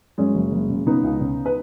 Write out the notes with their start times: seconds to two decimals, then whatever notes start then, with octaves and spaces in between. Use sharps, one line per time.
0.18 F#2 G#3 C#4
0.35 F#1
0.52 F#1
0.69 C#3
0.86 C#3 B3 D#4
1.04 C#2
1.21 C#3
1.46 B4